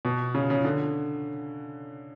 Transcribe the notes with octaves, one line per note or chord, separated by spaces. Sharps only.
B2
C#3
C#3
D3